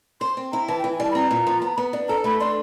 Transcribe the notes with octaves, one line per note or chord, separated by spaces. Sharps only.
C5 C6
C4
E4 A#5
E3 A5
G5
E3
G#5
G3 A5
B5
C4 A#5
A#2
F3
B3
B3
D4
A4 A#5
A3 B5
D4 C6